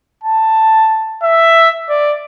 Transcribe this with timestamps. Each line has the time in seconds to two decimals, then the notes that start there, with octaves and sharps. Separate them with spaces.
0.24 A5
1.23 E5
1.90 D5